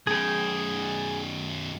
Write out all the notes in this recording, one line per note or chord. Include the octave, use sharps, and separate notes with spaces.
F#2 B2 G#4 G5